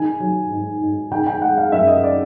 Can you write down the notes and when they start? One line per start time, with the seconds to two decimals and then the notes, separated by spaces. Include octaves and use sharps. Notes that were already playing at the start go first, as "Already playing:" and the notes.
Already playing: D#3 G#5
0.20 F#3
0.51 G#2
0.81 G#2
1.11 D#3 G5
1.27 G5
1.42 G#3 F#5
1.58 F5
1.72 F#2 E5
1.87 D#5
2.03 D5